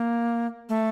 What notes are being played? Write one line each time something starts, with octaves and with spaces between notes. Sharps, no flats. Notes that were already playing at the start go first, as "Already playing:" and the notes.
Already playing: A#3
A3